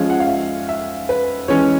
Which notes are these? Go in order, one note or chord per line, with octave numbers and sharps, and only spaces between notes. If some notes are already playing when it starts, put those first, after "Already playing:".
Already playing: F3 G#3 C#4 F5
F#5
F5
E5
E5
B4
E3 G#3 C#4 C#5